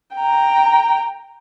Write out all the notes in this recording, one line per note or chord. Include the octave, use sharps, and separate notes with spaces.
G5 A#5